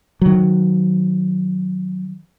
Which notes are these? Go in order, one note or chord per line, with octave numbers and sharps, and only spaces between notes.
D#3 F#3